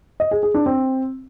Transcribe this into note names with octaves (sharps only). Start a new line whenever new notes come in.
D#5
G#4
G#4
D4
C4